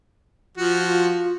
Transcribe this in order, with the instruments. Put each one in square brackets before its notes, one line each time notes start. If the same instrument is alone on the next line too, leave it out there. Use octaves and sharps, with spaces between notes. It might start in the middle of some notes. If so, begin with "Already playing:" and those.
[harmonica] F3 F#4 [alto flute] F4
[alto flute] F4